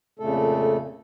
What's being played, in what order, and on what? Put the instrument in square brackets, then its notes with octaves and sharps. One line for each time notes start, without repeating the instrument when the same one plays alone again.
[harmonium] F2 A#2 C#3 A3 A4